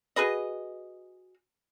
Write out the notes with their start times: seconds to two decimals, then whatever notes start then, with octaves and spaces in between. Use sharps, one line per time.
0.16 F#4 G#4 B4 D#5